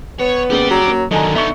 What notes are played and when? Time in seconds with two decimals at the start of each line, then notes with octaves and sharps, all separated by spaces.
0.20 B3 C#5
0.50 C#3 A#3 G4 G#4 D5
0.70 F#3
0.87 A#3 C#4
1.11 D3 D#3 F#3 D#5 G#5 A#5
1.35 B3 D#4 E5 C#6 C#7